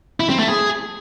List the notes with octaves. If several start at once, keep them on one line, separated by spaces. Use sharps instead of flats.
E4
C4
A3
G#4